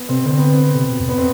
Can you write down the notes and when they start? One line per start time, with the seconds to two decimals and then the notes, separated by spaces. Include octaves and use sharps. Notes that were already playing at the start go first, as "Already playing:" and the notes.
Already playing: B3
0.09 C3 C4
0.26 D3 C4
0.39 B3
0.53 C4
0.75 C3
0.92 B2
1.00 F2
1.09 B3
1.18 C4